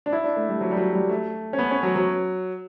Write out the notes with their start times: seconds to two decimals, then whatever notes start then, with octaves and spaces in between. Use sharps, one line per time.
0.06 D4
0.12 E4
0.24 D4
0.36 A3
0.49 G3
0.61 F#3
0.71 G3
0.77 F#3
0.94 G3
1.09 A3
1.53 C#4
1.59 B3
1.71 C#4
1.83 F#3
1.96 F#3